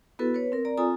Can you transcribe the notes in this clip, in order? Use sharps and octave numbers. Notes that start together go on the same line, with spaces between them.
B3 E4 F#4 A4 B4
B4 C#5
C4 A#4
D5 A#5
C4 F4 A4 G#5 A#5 D#6